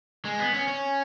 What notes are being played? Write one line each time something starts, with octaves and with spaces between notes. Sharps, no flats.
G#3
B3
C#4
C#4